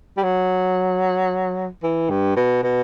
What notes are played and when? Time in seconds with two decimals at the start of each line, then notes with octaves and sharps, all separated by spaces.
0.17 G3
0.23 F#3
1.83 E3
2.10 G2
2.36 B2
2.64 B2